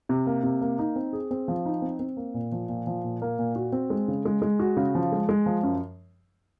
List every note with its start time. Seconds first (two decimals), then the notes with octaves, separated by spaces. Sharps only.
0.09 C3
0.27 A#3
0.43 C3
0.61 A#3
0.79 D#4
0.96 C4
1.13 G#4
1.31 C4
1.48 F3
1.66 D#4
1.82 C4
1.99 C4
2.17 A#3
2.34 A#2
2.52 F3
2.69 A#2
2.87 F3
3.04 A#2
3.22 A#3
3.39 A#2
3.56 F#4
3.72 C4
3.90 G#3
4.08 C#3
4.25 G#3
4.42 G#3
4.60 F#4
4.77 C#3
4.95 F3
5.12 G#3
5.29 G#3
5.46 F3
5.63 F#2